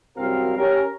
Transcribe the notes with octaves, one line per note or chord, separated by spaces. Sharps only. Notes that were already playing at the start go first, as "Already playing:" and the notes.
C2 F#2 C4 F#4 A#4 F5
C#4 G4 A#4